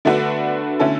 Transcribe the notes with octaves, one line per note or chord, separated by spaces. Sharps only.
D3 A3 D4 F#4 B4
D3 A3 C#4 E4 A4